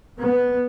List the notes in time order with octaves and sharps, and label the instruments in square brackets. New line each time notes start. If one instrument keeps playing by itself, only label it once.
[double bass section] B3